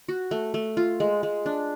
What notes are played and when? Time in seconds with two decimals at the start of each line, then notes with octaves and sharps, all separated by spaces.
0.09 F#4
0.31 A3
0.54 A3
0.77 F4
1.00 G#3
1.23 G#3
1.46 D4